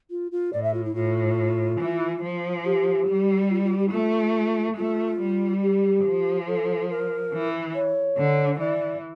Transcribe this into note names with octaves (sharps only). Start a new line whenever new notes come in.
F4
F4
A2 D5
E5
F4
E4
A2 F4
E3
F3
G4
G3
F4
F4
G4
E4
A3 F4
A3 F4
G3
G4
F3
A4
A#4
E3
C#5
D3
E3 D5